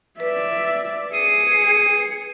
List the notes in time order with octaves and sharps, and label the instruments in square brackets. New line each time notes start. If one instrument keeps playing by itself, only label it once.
[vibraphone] B4 [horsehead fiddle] D5 E5
[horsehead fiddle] G#4 [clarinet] D#6 [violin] C7 C#7